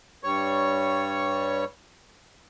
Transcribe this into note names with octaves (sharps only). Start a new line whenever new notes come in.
G2 G3 C#5 C#6